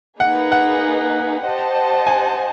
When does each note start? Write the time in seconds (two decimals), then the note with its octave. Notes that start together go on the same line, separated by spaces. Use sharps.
0.20 A#3 D#4 G#4 B4 F#5
0.52 F#5
1.44 G4 C5 D#5 F#5 A5
2.07 G#5